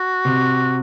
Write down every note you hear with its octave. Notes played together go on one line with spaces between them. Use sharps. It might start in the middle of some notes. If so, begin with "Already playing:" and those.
Already playing: F#4
C3